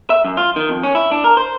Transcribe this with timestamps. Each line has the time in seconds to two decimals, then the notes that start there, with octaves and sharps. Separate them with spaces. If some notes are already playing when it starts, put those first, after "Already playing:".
0.10 E5
0.24 F#2
0.37 F4
0.56 D#3
0.69 F2
0.83 C#4
0.95 E4
1.11 D4
1.24 A#4
1.37 C5